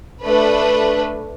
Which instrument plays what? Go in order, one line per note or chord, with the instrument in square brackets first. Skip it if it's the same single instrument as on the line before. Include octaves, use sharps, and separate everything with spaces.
[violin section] A3 D4 B4